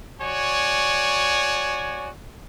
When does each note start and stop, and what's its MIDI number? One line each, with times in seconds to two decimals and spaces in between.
0.20 2.07 66
0.20 2.07 73
0.20 2.07 74
0.20 2.07 80